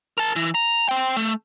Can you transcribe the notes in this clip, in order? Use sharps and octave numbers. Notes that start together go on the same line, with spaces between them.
A#4 A5
E3
A#5
C5 G5
A3